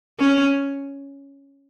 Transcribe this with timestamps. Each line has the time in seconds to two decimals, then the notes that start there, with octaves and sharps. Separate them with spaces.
0.20 C#4